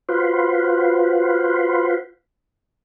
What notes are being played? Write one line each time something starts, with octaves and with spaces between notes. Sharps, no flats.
F4 F#4 B4 C5